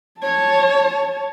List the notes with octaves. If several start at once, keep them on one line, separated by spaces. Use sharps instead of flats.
C#5 A5